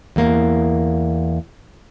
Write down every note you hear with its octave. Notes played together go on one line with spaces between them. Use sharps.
E2 A#3